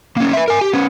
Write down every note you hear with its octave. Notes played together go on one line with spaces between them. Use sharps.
A#3 C#4
B4 E5
A#4 G#5
G4
B3 C#4